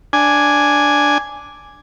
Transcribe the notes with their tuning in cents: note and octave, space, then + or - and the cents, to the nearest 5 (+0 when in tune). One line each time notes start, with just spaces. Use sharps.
D4 +0 G#5 +0